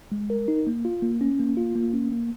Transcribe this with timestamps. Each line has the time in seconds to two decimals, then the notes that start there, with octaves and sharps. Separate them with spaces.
0.12 G#3
0.30 A#4
0.48 D#4
0.67 A#3
0.85 F4
1.02 A#3
1.21 C#4
1.39 A#3
1.57 F4
1.75 A#3
1.93 C#4
2.12 A#3